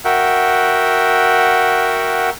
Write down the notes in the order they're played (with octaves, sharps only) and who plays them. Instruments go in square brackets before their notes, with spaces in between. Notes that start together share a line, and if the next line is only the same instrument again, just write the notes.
[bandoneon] F#4 A#4 E5 F#5 G5